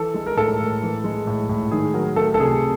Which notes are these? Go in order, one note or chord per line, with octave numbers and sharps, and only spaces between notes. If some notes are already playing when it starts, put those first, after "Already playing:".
Already playing: E3 A4
G#3
A#4
A2 A4
A2
E3
G#3
A2
A2
D#3 G#4
F#3 A#4
A3 A4
A4
C3 G#4